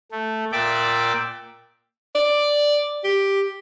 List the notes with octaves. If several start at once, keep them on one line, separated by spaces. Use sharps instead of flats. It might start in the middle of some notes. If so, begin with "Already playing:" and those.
A3
A#2 D5 E5 G5 D6
D5
G4